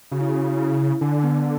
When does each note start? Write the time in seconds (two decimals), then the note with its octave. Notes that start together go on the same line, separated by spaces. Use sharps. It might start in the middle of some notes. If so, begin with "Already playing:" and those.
0.11 C#3 F#4
0.21 E4
0.30 F#4
0.56 E4
1.01 D3 D4
1.24 B3